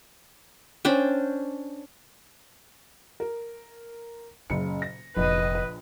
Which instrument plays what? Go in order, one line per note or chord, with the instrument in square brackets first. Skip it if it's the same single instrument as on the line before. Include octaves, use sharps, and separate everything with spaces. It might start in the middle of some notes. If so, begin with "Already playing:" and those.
[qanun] C#4 D4 C5 G5
[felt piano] A#4
[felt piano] F#1 C#3 C#7 [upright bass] A#2
[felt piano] A#6
[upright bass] F1 [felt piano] A#1 [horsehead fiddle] B4 D#5